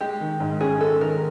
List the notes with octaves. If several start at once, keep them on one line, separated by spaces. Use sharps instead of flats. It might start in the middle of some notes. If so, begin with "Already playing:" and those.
G#3 G4
D#3
G#2
C#4 G#4
G#3 A4
D#3 A#4